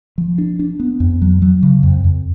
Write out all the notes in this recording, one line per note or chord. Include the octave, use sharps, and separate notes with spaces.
F3
D4
D4
B3
F2
F#3
F#3
C#3
F2
F2